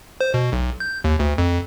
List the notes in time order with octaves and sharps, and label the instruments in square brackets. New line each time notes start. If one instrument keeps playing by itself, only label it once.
[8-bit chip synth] C5
B2
B1
G6
D#2
D2
F2